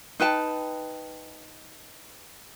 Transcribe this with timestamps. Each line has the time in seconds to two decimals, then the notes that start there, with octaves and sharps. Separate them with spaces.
0.20 D#4 B4 G5 A5